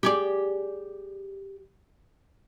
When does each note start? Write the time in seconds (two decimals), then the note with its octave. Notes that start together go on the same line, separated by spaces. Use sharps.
0.03 G4 G#4 D5